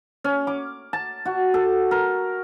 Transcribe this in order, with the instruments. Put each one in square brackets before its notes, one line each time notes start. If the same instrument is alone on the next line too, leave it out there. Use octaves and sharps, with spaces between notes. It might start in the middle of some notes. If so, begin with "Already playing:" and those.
[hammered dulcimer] C#4
D6
A5
F#4
A4
A#4